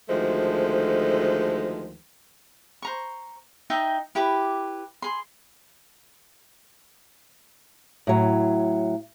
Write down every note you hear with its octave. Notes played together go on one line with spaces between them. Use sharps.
D2 D#3 F3 G#3 A3 C5
C5 A#5 C#6
D#4 D#5 E5 G5
E4 G4 B4 D6
G#4 C6
A2 F#3